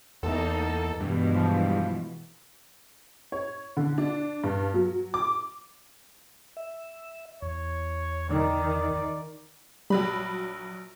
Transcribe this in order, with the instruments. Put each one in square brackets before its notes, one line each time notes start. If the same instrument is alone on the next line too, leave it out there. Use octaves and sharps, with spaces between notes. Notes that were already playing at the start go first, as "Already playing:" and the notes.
[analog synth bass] E2 [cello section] A#3 D#4 [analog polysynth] A4
[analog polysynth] G2 [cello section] B2 E3 G#3
[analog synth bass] F3
[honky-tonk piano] C#5
D3
D4
G2
F#3
D6
[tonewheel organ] E5
[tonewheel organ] E2 [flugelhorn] C#5
[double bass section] D#3 [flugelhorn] D5
[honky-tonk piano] A#1 F#3 B5 [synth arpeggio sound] G3